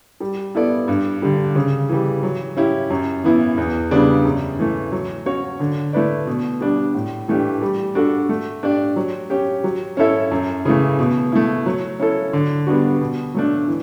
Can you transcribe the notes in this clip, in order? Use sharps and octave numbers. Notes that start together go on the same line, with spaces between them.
G3
B3 E4 A4 D5
G2
D3 G3
C#3
E3 G3
F#3
C#4 E4 G4
F#2
E3 B3 E4
E2
C#3 G3 B3 D4
F#2
E3 A3
F#3
C#4 F#4 C#5
D3
A3 E4 B4 D5
B2
G3 D4
A2
E3 A3 D4 G4
G3
D4 F#4 A4
A3
D4 G4 D5
F#3
C#4 G4
F#3
C#4 E4 A4 E5
F#2
C#3 E3 A3
B2
A3 E4
F#3
C#4 E4 A4
D3
G3 B3 D4 F#4
B2
F#3 A3 D4
E3